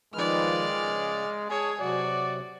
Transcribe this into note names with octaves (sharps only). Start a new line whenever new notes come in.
D#3 F3 G#3 B4 D5 F6
C#3
G#4 C#5 A5
C3 F#3 F#4 D5